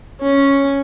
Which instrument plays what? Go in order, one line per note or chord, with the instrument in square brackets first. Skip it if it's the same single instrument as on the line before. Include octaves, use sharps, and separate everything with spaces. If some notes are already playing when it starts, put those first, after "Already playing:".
[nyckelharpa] C#4